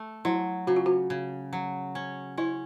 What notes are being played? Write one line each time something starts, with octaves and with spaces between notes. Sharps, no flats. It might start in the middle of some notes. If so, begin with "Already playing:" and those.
Already playing: A3
F#3 E4
C#3 F#4
F4
F#4
C#3
F#3
C#4
C#4 E4